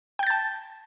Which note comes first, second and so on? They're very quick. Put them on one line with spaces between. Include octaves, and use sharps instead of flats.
G5 G6 A6 A5